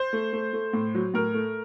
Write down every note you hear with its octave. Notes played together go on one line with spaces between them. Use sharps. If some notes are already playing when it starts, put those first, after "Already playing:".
Already playing: C5
A3
A3
A3
A2
F#3
A2 A#4
A3